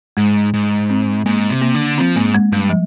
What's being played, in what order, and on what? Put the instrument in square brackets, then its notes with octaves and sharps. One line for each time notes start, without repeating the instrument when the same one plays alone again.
[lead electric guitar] G#2 [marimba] G#3
[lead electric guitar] G#2
[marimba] C4
[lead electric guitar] G#2 [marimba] A#3
[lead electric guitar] C3
[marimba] A#3
[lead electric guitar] D3
[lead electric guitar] F3 [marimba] C4
[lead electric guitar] G#2 [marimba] A#3
[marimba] G#3
[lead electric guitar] G2 [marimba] G3
[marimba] F3